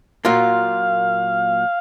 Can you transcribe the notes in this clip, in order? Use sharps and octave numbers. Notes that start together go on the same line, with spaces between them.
A#2 F#3 A#3 F4 F5